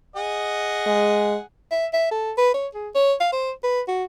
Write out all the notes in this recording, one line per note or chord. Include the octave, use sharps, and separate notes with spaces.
G#4 D#5 F#5
G#3
E5
E5
A4
B4
C#5
G#4
C#5
F5
C5
B4
F#4